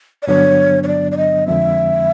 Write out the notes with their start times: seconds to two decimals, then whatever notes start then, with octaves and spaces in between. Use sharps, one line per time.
0.23 D5
0.27 G2 D3 F#3 B3 D4 C#5
0.83 C#5
0.87 D5
1.12 D5
1.17 D#5
1.47 F2 D3 F3 G#3 C4 E5